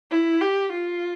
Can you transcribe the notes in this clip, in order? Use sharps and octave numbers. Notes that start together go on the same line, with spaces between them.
E4
G4
F4